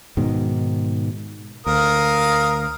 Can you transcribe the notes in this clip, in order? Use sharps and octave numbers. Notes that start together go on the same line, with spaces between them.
G#2 B2 D#3
D2 A#4 F5 D#6